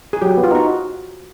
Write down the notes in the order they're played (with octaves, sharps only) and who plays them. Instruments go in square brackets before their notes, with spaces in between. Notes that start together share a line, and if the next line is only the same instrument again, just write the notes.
[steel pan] G#4
[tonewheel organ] F#3 [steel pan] G4
[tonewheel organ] B3
[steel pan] F4
[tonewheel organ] D#4 [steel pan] F#4